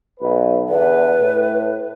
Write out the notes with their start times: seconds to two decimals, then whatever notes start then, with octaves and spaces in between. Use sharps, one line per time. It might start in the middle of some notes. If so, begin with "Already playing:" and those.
0.20 B1 B4
0.69 E2 D3 B4
1.20 A2